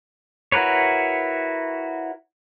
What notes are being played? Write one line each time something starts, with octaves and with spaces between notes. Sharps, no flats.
E4 F#4 A#4 B4 C#5